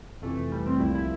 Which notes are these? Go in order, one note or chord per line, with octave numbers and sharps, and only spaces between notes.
F2 C3 E3 A3
A3
G3
C4
C2 A#2 F3 E4
E4